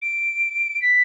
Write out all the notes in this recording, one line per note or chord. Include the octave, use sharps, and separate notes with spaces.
D7
B6